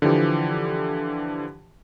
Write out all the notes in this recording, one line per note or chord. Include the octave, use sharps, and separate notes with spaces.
D3 E3 F3 G4